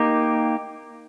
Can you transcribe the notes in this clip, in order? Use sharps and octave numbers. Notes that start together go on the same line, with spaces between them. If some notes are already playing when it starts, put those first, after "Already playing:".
Already playing: A#3 D#4 G4